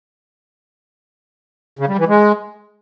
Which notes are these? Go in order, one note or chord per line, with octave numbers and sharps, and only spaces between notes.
C#3
G3
E3
G#3